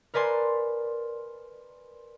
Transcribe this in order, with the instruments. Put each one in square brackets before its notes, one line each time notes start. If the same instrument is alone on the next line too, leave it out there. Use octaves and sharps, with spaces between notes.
[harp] A#4 B4 D5 G#5 C6